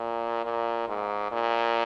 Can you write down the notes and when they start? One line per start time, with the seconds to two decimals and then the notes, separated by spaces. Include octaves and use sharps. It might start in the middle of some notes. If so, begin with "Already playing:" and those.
Already playing: A#2
0.45 A#2
0.88 G#2
1.32 A#2